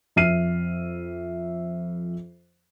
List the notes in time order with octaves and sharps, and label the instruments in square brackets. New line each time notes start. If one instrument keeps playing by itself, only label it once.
[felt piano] F2 E5 F6 C7 D#7